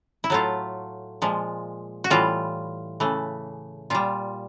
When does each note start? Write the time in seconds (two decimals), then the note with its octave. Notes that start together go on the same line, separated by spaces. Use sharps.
0.24 E4
0.30 A2 F#3 A3 F4
1.22 A#2 F3 G#3
2.04 F#4
2.10 A2 E3 G3 F4
3.00 C#3 E3 A3
3.90 A#2 G3 F4